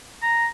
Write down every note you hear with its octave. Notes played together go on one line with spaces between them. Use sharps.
A#5